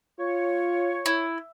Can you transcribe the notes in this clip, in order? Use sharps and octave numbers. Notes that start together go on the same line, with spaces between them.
F4 C#5
E4